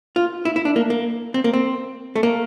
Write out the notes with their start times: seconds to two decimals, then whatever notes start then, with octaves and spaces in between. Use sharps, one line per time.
0.16 F4
0.45 E4
0.56 E4
0.65 D4
0.76 A#3
0.90 A#3
1.34 C4
1.44 A#3
1.53 C4
2.16 A3
2.23 A#3